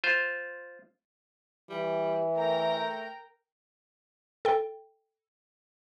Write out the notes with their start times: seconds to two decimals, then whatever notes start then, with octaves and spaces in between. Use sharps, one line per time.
0.04 F4 C5
1.70 E3 G3
2.36 A3 A#4 G5 A#5
4.45 A4 G5